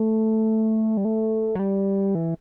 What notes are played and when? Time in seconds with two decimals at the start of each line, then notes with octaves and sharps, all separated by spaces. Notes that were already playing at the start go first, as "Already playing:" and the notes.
Already playing: A3
0.97 G3
1.05 A3
1.55 F#3
1.59 G3
2.15 E3